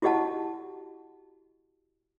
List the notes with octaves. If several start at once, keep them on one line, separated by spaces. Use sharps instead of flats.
E4 F#4 G4 D#5 F#5 A5